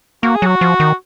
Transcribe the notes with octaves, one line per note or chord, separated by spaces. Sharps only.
A#3 F#4
G#4
F#3 F#4
F3
D#3